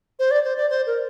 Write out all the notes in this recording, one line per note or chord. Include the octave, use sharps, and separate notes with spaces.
C5
D5
C5
D5
C5
A#4